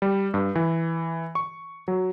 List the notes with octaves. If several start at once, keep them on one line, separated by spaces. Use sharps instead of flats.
G3
G2
E3
C#6
F#3